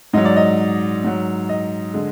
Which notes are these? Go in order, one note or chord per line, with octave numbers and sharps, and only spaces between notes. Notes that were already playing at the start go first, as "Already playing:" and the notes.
G#2 F#3 D#5
D5
D#5
G#2 F#3
D#5
D3 G#3